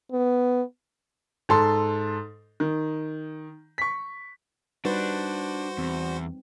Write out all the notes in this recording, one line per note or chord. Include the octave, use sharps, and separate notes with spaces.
B3
G#2 A4 C6
D#3
C#6 B6
G3 D4 D#4 F#4 B4 C5
E2 C4